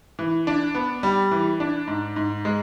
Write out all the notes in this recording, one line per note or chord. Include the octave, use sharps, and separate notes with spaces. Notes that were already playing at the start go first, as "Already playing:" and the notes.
E3
D4
B3
G3
E3
D4
G#2
G#2
G#3